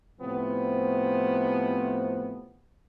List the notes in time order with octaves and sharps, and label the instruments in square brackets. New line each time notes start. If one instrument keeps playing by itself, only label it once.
[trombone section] A2 C3 F3 B3 C4